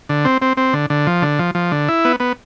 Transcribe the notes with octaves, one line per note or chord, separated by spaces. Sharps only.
D3
C4
C4
C4
D3
D3
F3
D3
F3
F3
D3
E4
B3
B3